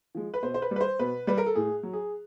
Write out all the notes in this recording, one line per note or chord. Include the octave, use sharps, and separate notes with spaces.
F3 G#3
B4
B2 C5
C5
B4
G3
B4
C5
B2 B4
G3 B4
A#4
A4
A2 G#4
F#3
G#4